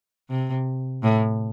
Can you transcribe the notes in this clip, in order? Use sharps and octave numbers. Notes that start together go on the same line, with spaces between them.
C3
A2